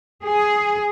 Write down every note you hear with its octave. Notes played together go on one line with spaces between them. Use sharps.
G#4